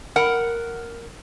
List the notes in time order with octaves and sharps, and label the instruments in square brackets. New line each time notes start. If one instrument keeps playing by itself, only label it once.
[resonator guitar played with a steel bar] A#4 F#5